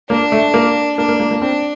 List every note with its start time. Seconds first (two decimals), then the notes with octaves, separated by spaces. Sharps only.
0.10 A#3 D4
0.32 A3
0.54 A#3
0.98 A#3 D4
1.09 A#3
1.20 A#3
1.31 A#3
1.42 C4 D4